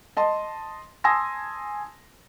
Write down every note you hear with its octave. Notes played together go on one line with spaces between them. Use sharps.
D#5 A5 C6
G#5 A5 C6 D#6 E6 A#6